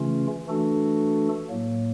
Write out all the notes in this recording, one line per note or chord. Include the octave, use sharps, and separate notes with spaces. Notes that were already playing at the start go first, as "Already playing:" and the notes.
Already playing: C#3 E3 A3 C#4 F4
E3 A3 D4 F#4 A4
A2 F#3 A#3